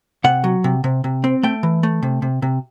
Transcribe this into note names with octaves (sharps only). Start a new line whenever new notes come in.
C3 F#5
F#3
C3
C3
C3
C4
A3 G5
E3
A3
C3
C3
C3